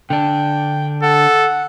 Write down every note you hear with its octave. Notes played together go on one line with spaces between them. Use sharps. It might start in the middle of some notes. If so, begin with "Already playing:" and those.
D3 D4 G5
A4 F#5